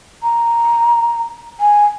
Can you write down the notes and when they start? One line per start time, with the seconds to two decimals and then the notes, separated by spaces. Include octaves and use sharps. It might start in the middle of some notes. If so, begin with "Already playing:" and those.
0.23 A#5
1.60 G#5